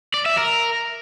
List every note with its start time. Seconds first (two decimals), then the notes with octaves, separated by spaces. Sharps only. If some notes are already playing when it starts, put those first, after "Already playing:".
0.14 D5
0.26 E5
0.38 A#4